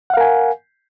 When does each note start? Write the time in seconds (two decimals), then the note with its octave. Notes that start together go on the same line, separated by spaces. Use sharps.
0.10 F#5
0.14 F5
0.17 A#4
0.21 G#5